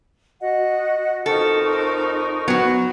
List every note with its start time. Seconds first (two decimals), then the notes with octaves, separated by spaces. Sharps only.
0.41 F#4 D#5 F#5
1.26 F2 D#4 A4 A#4 C#6
2.48 F#3 B3 F#4